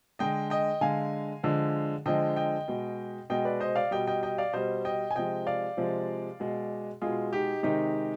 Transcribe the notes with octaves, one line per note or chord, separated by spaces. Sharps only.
D3 G#3 D#5 G5
D#5 G5
D3 G#3 F5 G#5
D3 F3 G#3
D3 F3 G#3 D#5 G5
D#5 G5
B2 G#3
B2 G#3 D#5 G5
B4 D5
C5 D#5
D5 F5
B2 G3 D#5 G5
D#5 G5
D#5 G5
D5 F5
B2 G3 C5 D#5
D#5 G5
G#5
C3 F3 G#3 D#5 G5
D5 F5
C3 F3 G#3
B2 G#3
B2 G#3 F4 G#4
D#4 G4
C3 D#3 G#3 D#4 G4